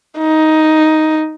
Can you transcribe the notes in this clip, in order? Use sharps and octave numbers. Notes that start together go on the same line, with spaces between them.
D#4